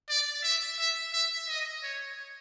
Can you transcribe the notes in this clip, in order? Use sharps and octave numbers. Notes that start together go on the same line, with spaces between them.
D5
E5
E5
E5
D#5
C#5